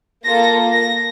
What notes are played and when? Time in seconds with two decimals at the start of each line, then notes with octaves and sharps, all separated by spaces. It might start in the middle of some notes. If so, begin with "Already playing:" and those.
0.24 A#3 F4 A4 A#6
0.72 A#6